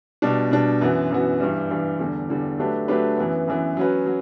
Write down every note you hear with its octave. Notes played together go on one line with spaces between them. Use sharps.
B2 G3 D4
B2 G3 D4
F#2 E3 B3 F#4
F#2 E3 B3 F#4
G2 E3 G3
G2 E3 G3
E2 D3 G3
E2 D3 G3
F#3 A3 D4 G4 B4
F#3 A3 D4 G4 B4
F#2 E3 B3
F#2 E3 B3
F#3 C#4 F#4 B4
F#3